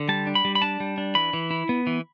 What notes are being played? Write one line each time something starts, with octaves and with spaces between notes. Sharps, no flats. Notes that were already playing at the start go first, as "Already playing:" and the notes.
Already playing: D3
G3 A5
D4
B5
G3
B5
D4 A5
G3
D4
E3 B5
E3
E4
B3
E3